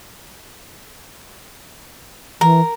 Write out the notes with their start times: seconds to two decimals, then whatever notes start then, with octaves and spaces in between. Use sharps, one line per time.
2.41 E3 A#4